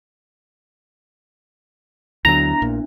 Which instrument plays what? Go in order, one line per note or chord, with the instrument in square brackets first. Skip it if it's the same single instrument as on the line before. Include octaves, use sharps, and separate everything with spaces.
[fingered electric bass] D2 D3 F#3 [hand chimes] B3 D4 E4 [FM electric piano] A#5
[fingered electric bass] A#1 A#2